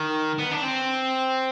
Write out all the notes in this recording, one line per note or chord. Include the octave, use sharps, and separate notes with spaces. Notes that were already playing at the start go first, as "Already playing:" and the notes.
Already playing: D#3
B3
D4
C4